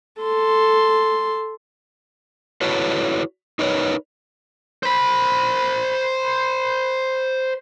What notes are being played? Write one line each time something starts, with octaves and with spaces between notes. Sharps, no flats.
A4 C6
E4 F#4 A4 B4 C#5
D#4 A#4 B4 C#5
C5 B5